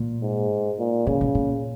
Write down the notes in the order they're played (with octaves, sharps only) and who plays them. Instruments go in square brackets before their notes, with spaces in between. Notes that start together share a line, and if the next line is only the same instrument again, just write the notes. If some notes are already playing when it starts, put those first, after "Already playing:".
Already playing: [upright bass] A#2
[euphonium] G#2
A#2
[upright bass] A#2 [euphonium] C#3
[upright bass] B2
A#2